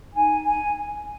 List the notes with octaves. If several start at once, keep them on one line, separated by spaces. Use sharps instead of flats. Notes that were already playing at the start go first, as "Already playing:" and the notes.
D#4 G#5
G#5